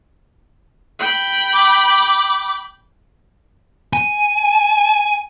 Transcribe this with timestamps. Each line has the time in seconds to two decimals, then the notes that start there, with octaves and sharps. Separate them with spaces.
1.00 G5 B5
1.53 D6
3.93 G#5